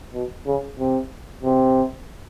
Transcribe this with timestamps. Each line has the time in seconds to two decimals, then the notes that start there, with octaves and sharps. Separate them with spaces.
0.13 B2
0.47 C#3
0.79 C3
1.43 C3